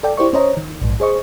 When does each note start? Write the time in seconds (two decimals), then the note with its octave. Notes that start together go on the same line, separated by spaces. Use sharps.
0.03 A4 D5 G5
0.17 E4 G4 C5 D5 C#6
0.33 C#4 C5 C#5 D#5 A#5
0.57 D#3
0.82 A#1 G#2
1.00 G#4 C5 D#5 C#6